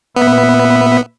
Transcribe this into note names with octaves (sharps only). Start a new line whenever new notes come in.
A#2 B3 B4 E5